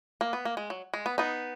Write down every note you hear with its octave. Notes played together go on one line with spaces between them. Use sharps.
A#3
B3
A#3
G#3
F#3
G#3
B3
B3 D#4